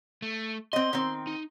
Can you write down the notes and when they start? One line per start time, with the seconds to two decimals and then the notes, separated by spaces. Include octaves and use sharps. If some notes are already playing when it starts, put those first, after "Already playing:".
0.22 A3
0.73 C4 D#5 C6
0.93 D#3 C4
1.27 D#4